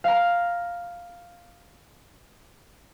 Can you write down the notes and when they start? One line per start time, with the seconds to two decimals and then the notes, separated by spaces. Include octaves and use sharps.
0.04 F5 A#5